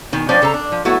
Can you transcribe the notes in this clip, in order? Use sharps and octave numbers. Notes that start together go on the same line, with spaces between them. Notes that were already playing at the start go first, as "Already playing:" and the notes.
B2 D#3 G#5
F3 C#4 D4 C5 D5 G5
C#3 A4 C5 A#5
D4
F3
F#3 A3 B3 E4 F#4